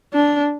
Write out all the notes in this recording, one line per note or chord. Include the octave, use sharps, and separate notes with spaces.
D4